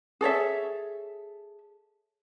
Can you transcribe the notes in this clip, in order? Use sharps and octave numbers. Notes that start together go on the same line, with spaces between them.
G#4 A4 C#5 E5